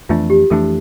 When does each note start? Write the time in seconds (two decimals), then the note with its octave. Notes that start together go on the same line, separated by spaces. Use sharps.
0.09 F2 E3 A3 D4 F4
0.30 G4
0.50 F2 E3 A3 D4 A4